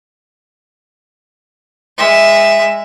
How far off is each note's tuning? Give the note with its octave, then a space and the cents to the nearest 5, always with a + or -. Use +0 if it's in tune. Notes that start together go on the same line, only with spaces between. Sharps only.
G#3 -20 E5 +0